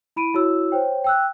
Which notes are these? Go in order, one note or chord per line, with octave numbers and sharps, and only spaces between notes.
E4 B5 D7 D#7
E4 F#4 C#5 E6
C5 C#5 G5
G5 E6 F#6